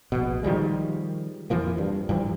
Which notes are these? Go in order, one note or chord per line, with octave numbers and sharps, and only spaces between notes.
A#1 B2
D#3 F3 G3 G#3
F2 E3 F3 A#3
G2
G2 E3 F3